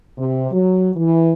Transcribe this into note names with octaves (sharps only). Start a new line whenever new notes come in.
C3
F#3
E3